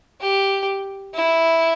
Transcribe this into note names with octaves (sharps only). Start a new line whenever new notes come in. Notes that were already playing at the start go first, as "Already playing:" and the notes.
G4
E4